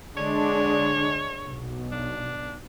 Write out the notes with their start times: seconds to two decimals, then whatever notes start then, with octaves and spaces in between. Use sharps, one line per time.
0.17 D3 G#3 D4 C#5
1.46 B1
1.92 D4